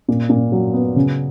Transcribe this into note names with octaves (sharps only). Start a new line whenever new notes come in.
A#2
A#2
F#3
B3
C#3